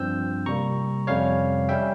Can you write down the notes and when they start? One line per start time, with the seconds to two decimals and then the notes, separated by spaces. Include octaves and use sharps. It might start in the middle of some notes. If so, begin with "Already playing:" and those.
Already playing: G2 F3 C4 E6 G6
0.46 C3 G3 A#3 A#5 C#6
1.07 F2 C3 G3 C#4 C#5 F5
1.69 G3 C#4 E5 G5